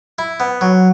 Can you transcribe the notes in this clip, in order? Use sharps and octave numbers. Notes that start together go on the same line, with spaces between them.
E4
B3
F#3